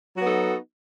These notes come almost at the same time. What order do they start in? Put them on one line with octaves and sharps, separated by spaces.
F#3 F#4 B3 D#4 A4